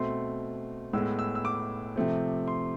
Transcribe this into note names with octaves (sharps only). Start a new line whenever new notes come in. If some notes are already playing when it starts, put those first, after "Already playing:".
Already playing: B2 A3 C4 C6
A2 G#3 B3 E6
E6
E6
D6
C3 F3 A3 C4
C6